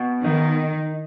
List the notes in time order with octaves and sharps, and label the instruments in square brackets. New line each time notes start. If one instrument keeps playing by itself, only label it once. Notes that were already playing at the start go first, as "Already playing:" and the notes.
Already playing: [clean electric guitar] B2
[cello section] D#3 [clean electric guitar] D#4